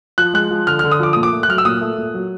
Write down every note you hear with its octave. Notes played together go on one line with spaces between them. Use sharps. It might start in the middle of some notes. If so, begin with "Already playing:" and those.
F3 F#6
G#3 F#6
F3
D3 F6
F6
D3
D#6
F3 D6
A#2 D#6
D6
A3
F#6
F#3 F6
E6
A#2 D#6
A3
A#2
F#3